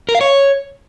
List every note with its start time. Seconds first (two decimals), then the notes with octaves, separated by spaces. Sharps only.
0.09 A#4
0.15 F5
0.21 C#5